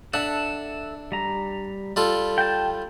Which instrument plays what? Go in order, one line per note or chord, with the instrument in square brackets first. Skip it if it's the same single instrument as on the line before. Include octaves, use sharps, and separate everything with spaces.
[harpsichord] D4 [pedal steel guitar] A4 E5 F#5
[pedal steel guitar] G3 A#5
[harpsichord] G3 F4 A4
[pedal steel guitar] G5 A5